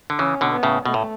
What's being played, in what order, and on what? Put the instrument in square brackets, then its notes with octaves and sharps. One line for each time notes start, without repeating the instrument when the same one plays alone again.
[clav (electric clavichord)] D3
[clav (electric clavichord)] C#3 E3 [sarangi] C#4
[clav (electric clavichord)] B2 D3
[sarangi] B3
[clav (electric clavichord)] A2 C#3
[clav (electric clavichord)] B2 [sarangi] A3
[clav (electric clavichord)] A2